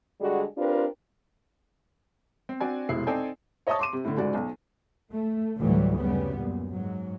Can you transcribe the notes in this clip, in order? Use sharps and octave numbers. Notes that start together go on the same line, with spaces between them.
D3 G3 G#3 F#4 G#4
C4 D4 F4 G4 A#4 B4
C4
C4 D4 F#4 D5 G#5
F1 B2 G#3 E4 C7
C4 D#4 A4 D5 G5 G#5
C#5 D#5 E5 A5 C#6 D#6
C6 D6 D#7
C3
A2 D3
C#2 G#2 F#4 D5
B1
A3
D2 A2 E3 F#3 G3
F#2 C#3 G3 B3
F#2 A#2
G#2 F#3